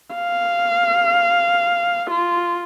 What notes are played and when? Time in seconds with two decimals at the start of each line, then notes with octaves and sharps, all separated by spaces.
0.15 F5
2.11 F4